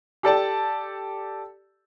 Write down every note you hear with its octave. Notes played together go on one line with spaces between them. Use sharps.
G4 A4 D5 A5